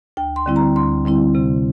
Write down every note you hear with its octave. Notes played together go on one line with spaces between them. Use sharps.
D2 G5
C6
D3 G3 C4 E4
A#5
D2 C6
D3 G3 C4 E4
C3